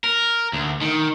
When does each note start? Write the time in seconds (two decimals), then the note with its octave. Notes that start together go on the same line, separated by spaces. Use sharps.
0.04 A#4
0.53 D2
0.81 D#3